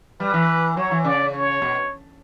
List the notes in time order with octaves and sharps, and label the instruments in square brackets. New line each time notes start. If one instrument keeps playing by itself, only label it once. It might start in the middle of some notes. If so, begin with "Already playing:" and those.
[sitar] G3 [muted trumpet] B4
[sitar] E3
[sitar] F#3 [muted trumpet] C#5
[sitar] E3
[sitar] C#3 [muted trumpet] D5
[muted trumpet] C#5
[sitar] B2